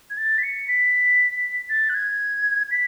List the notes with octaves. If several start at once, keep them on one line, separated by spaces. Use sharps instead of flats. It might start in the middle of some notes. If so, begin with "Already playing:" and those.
G#6
A6
B6
C#7
B6
A6
F#6
G#6
B6